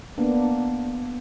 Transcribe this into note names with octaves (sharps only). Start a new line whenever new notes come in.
A#3 B3 D4